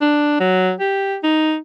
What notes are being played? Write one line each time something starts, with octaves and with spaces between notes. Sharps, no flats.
D4
F#3
G4
D#4